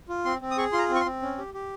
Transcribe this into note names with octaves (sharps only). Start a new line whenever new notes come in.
F4
C4 C6
C4
D#6
G#4 C#6
F4 C6
A#5
C4
C#6
C6
C4
C#4
G4
G4